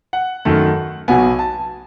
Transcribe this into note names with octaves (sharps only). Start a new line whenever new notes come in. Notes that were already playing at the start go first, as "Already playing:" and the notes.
F#5
F#2 D#3 A3
B1 B2 F#3 B3 G#5
A5